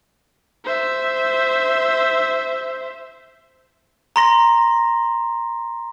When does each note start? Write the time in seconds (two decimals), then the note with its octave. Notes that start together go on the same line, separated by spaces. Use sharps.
0.65 C5 E5
4.16 A#5 C6 A#6